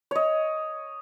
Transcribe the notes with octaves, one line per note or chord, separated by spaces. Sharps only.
C#5 D#5